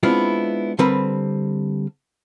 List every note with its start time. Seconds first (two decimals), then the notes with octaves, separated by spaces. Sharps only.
0.03 G#3 B3 C4 D4 E4 F4
0.79 D3 G3 C4 A#4 B4